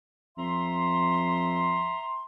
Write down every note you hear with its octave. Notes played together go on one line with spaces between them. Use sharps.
F2 E5 A#5 C6